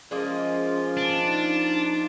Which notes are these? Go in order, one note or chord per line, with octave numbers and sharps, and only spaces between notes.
F3 G#3 A#3 C#4 F4 D#5
D4
D#4